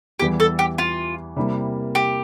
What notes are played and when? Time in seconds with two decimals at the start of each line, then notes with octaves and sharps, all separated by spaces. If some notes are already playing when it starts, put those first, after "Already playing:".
0.19 E2 E3 G3 G4
0.40 A4
0.59 G4
0.78 F4
1.36 C3 G3 A#3 E4
1.95 G4